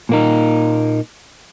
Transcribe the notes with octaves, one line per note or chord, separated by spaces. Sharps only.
A#2 A#3 D#4